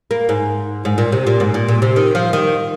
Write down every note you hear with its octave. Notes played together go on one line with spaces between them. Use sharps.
A#3
G#2
G#2
A#2
C3
A#2
G#2
A#2
A#2
C3
D#3
F3
D#3